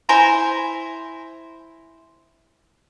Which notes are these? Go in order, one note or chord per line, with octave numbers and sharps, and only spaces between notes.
E4 C5 G#5 A#5